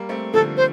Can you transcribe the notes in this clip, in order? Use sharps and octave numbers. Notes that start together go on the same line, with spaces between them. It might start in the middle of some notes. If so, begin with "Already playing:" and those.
Already playing: G3 A#3
A3 C4
D3 F3 A4
C5